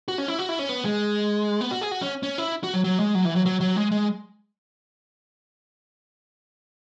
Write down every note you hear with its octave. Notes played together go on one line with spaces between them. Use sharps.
F#4
C#4
E4
F#4
E4
C#4
B3
G#3
B3
F#4
G#4
F#4
C#4
C#4
E4
F#4
F#3
F#3
G#3
F#3
E3
F#3
F#3
F#3
G#3
G#3